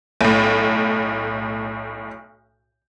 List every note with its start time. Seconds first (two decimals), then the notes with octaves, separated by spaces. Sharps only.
0.21 B1 A2